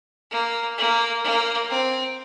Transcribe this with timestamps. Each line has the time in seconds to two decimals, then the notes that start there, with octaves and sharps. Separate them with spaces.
0.31 A#3
0.78 A#3
1.24 A#3
1.70 C4